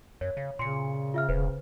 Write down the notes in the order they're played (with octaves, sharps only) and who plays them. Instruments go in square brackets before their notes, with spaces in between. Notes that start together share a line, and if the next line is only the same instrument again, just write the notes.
[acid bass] F#2 [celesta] C#5
[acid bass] C#3
[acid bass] A#2 [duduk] C#3 [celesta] C6 C#7
[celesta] F4 E5 F6
[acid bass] E1 [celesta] B4 C5